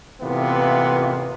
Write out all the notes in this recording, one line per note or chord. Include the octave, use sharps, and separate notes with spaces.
A1 C3 E3 A#3 B3 F4